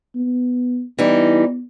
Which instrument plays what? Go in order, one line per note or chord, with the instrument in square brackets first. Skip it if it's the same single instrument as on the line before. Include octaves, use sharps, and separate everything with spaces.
[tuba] B3
[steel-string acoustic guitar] E3 G3 D#4 [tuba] B3